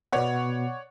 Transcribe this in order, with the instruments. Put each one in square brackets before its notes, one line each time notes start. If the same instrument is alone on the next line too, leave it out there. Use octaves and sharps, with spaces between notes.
[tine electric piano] B2 B3 [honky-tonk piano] C#5 D5 F#5